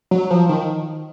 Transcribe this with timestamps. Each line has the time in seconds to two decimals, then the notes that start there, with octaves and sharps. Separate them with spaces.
0.11 F#3
0.31 F3
0.49 D#3